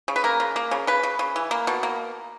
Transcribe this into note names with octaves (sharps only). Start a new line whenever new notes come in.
C#3
B4
A#3 A#4
C#3
A#3
C#3
C#3 B4
C#3
C#3
E3
A#3
B2
A#3